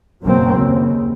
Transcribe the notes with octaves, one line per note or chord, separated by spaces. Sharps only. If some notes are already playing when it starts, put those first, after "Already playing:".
F#1 F#2 B2 F#3 A#3 C4
D#2 C#3